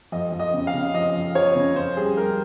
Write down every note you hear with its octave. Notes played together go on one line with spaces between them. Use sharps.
F2 D#5
F2
D#5
C#3
F5
C#3
F3 D#5
F2
F3 C#5
C#3
F2 C5
G3 G#4
G3 A#4